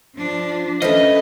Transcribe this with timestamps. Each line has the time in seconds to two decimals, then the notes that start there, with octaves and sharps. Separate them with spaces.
0.16 F3 D4
0.82 F3 A3 C#4 B4 D#5